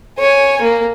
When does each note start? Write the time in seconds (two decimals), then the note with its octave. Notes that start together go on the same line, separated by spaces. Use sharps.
0.19 C#5 G#5
0.62 A#3